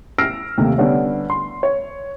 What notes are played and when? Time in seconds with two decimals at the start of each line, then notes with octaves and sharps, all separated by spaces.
0.18 E6 F6 A#6 C7 D7
0.58 D#2 C3 D#3 A3 A#3
0.78 D3 G3 B3 C#4
1.30 C6
1.63 C#5